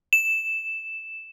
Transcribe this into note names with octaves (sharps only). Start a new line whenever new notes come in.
E7